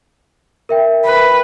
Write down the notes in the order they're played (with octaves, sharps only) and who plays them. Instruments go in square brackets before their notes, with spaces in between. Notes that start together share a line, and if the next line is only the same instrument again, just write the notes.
[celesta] A#4 E5 G5
[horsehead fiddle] B4